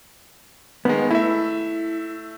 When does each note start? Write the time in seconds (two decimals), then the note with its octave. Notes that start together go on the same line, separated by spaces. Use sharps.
0.85 D#3 G#3 B3
1.11 A3 E4 E5